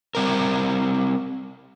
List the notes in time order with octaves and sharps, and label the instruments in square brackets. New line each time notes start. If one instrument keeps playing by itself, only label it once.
[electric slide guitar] G3 C4 A#4